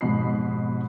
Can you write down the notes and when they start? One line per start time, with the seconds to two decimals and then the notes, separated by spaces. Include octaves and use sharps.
0.01 F1 G#2 B2 D#5 B5 C7